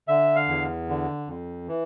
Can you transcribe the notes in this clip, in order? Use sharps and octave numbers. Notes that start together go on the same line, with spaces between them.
D3 E5
F5
E2
D3
F2
E3